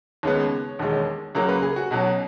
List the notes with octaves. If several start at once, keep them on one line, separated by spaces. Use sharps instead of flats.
D#2 C#3 G#3 B3 C#5
E1 D#2 D#3 G#3
C#2 C#3 F#3 A#3 C#5
B4
G#4
F#4
B1 B2 F#3 C#4